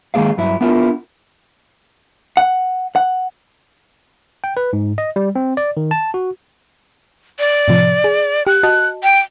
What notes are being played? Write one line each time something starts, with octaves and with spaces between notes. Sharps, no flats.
D#3 G#3 A#3 G#4 F5
G2 F#3 E4
B3 D4 E4 F4 A#4
F#5
F#5
G5
B4
G#2
D#5
G3
C4
D5
D#3
A5
F#4
D5
A2 C3 F3
G#4
G4 F#6
F#4 D#5 A5
G5